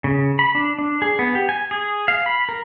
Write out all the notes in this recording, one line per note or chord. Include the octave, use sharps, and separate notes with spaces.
C#3
B5
D4
D4
G#4
B3
G4
G#5
G#4
F5
B5
A#4